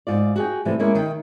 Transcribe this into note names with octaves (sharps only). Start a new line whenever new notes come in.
G#2 F4 D5
F#4 G#4 G5
A2 C3 E3 F3 G3 A3
G#3 A#3 C#4 E4 G#4 A#4
D#3 G5